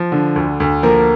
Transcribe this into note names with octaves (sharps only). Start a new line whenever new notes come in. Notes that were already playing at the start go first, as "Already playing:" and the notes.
Already playing: F3
D3
D2
D2
F3 A#3 A#4